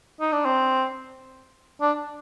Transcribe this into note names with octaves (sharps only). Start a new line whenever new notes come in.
D#4
D4
C4
D4